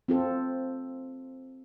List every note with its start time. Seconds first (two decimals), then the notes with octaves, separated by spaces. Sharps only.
0.08 C4 F4 A4